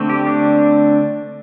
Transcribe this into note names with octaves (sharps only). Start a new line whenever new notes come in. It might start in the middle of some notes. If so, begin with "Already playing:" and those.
Already playing: D3 A3 C4
G4
D4